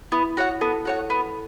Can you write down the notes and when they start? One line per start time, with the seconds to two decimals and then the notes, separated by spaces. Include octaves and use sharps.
0.12 B3 E4
0.37 F#4 C#5 F#5
0.61 B3 A4
0.85 F#4 C#5 F#5
1.10 B3